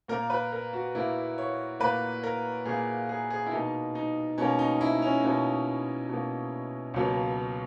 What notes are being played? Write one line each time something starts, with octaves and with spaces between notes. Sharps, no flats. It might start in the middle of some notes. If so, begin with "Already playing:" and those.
A#2 A#3 A#4
B4
A#4
F#4
A#2 A#3 E4
C#5
A#2 A#3 B4
A#4
A#2 A#3 G#4
G#4
G#4
E4
B2 A#3 D#4
D#4
B2 A#3 C#4
D#4
E4
C#4
B2 A#3 C#4
B2 A#3
C#2 B2 F#3 A#3